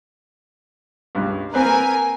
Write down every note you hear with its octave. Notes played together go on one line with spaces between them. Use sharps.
C#2 G2
A#3 C4 A#4 B4 G#5